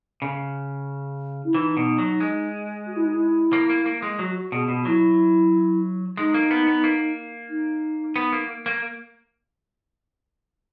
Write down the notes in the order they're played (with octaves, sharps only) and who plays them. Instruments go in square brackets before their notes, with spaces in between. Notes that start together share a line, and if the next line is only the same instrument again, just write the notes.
[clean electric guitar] C#3
[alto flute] E4
[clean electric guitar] E3 [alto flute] D#4
[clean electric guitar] B2
F#3
G#3
[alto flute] F#4
E4
D#4
E4
[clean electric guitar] A#3
A#3
A#3
G#3
[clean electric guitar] F#3 [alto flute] F#4
[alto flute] F#4
[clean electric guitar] B2 [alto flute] G#4
[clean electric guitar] B2 [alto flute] F#4
[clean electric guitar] F#3 [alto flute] E4
[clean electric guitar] G#3 [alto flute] D#4
[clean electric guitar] A#3
B3
B3
A#3
[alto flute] D#4
[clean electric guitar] B3
A#3
A#3